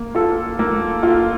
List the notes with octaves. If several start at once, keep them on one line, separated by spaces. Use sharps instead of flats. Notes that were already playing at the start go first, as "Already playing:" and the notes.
Already playing: A#3
F4 A4
A#3
F4 A4